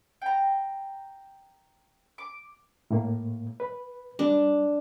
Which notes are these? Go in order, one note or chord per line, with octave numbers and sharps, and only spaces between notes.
G5 A#5
D6
A2 A#3
B4
G3 D4